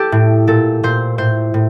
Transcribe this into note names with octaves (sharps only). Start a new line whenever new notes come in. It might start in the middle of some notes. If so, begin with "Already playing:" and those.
Already playing: G4 A4
A2
A#2 A4
A#2 C5
A2 C5
A2